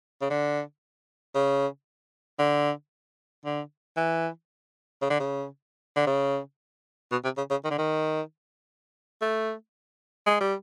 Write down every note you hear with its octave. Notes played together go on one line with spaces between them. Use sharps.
C#3
D3
C#3
D3
D3
E3
C#3
D3
C#3
D3
C#3
B2
C3
C#3
C#3
D#3
D3
D#3
A3
G#3
G3